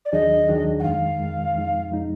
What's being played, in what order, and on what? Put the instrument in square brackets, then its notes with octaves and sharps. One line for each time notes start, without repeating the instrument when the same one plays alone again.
[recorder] D5
[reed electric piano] D#2 D#3 F#3 D4 G#4 [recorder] D#5
[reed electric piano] D#2 D#3 F#3 D4 G#4
[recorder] F#5
[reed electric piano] F2 D#3 G#3 [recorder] F5
[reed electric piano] F2 D#3 G#3
F2 F3 G#3 D#4
F2 F3 G#3 D#4